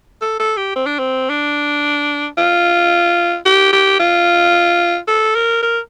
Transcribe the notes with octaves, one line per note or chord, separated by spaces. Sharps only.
A4
A4
G4
C4
D4
C4
D4
F4
G4
G4
F4
A4
A#4
A#4